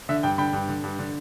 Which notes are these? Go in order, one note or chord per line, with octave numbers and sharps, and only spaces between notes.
D3 E5
G2 G5
D3 G5 B5
G2
D3
G2
D3